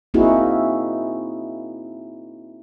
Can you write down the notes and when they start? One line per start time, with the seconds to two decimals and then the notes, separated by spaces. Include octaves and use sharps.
0.14 A#3 C4 D#4 E4 F#4 G#4